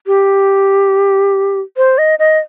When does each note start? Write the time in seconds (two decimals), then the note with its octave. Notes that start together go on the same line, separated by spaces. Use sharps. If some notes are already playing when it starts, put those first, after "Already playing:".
0.07 G4
1.77 C5
1.98 D#5
2.19 D#5